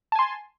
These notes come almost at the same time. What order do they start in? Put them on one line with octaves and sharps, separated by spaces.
A5 G#5 C6